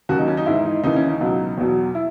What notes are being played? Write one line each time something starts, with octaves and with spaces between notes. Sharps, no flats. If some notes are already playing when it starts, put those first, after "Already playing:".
D#2 C#3 F#3 F#4
D#4
C#4
D#4
G#2 E3 E4
D#4
D#2 C#3 E3 D#4
C#4
D#4
C#2 B2 F#3
E2 B2 F#3
E4